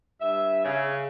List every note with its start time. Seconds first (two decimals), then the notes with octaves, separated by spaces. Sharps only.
0.21 G2 E5
0.65 C#3